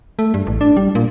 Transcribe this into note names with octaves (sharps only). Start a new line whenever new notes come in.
A3
G2
A1
D4
G3
A#2